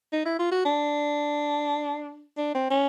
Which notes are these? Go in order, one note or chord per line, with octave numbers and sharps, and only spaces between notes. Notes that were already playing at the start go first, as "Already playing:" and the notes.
D#4
E4
F4
F#4
D4
D4
C4
C#4